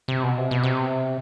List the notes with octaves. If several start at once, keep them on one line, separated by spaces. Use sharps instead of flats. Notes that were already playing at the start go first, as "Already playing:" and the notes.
C3
B2
C3
B2
C3